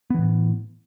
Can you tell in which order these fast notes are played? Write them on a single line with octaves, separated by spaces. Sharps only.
B3 E3 A2